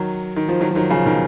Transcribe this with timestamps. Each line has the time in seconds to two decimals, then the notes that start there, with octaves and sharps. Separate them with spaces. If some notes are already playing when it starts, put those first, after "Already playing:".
Already playing: D#3 F#3
0.36 D#3
0.49 F3
0.61 D#3 F#3
0.71 F3
0.75 D#3 F#3
0.90 C#3 F3
1.05 B2 D#3